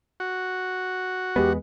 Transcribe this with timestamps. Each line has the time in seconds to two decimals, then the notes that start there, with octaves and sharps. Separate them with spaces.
0.20 F#4
1.36 E2 G#3 B3 G4